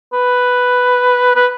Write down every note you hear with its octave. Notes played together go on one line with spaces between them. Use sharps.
B4
B4